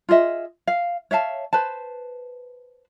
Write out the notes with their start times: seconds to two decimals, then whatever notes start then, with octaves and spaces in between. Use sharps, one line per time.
0.09 F4 G#4 D#5 E5
0.68 F5
1.11 C#5 E5 F5 A5
1.53 B4 C5 A5